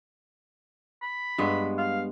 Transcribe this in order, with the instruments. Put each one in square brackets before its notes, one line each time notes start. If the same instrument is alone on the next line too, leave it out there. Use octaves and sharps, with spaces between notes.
[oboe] B5
[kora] G2 G#3 B3
[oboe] F5